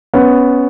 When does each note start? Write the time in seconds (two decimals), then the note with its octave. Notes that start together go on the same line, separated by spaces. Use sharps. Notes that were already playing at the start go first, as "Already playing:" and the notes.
0.14 B3 C#4